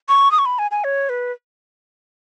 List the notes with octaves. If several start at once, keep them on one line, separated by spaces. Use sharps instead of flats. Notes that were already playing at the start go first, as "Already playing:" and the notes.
C#6
D#6
C#6
B5
G#5
G#5
C#5
B4